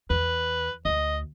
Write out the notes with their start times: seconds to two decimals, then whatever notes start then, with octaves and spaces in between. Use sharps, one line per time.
0.10 E2 B4
0.85 D2 D#5